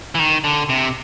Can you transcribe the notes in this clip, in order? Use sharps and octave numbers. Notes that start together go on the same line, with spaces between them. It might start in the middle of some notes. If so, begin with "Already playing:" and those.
E3
D#3
D3
C3